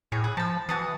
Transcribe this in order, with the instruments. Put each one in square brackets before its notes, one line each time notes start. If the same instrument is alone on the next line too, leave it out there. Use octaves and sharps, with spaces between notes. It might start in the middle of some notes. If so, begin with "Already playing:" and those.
[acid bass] A2 [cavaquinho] G#4 C#5
[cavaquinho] G#4 F#5
[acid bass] F3 [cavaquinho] A5 B5
[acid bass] E3 [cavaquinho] F#4 A5 D#6